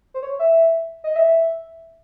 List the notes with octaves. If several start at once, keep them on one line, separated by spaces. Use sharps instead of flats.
C5
C#5
E5
D#5
E5